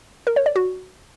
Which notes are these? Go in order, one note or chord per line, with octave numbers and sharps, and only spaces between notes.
A#4
C#5
D5
F#4